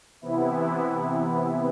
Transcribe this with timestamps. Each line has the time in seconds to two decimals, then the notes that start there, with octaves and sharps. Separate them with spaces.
0.22 C3 E3 B3 E4